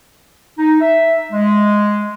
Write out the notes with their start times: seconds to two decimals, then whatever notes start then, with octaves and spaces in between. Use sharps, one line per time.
0.58 D#4
0.81 E5
1.32 G#3